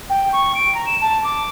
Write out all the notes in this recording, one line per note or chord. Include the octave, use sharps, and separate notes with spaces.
G5
C#6
D7
A#5
E7
A5
D6